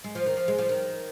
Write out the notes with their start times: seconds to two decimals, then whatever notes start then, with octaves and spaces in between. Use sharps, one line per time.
0.04 G#3
0.15 F3
0.26 D#3
0.37 F3
0.48 G#3
0.58 F3
0.69 D#3